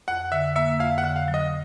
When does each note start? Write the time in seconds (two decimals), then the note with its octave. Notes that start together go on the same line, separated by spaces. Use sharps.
0.08 F2 F#5
0.32 D3 E5
0.56 A#3 E5
0.80 F2 F5
0.98 F#5
1.04 D3
1.16 F5
1.28 F#3
1.34 D#5